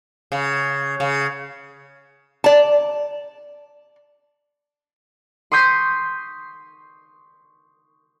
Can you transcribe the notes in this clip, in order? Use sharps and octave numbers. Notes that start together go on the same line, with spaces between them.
C#3
C#3
D5 A5
C6 C#6 D#6 G6 B6 C7